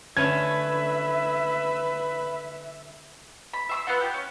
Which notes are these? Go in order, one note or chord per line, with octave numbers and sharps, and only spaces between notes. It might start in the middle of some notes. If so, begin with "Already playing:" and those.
D3 A3 C#4 B4 E5 G#6
B5
E5 C6 E6
B3 F4 F#5
G4
C#4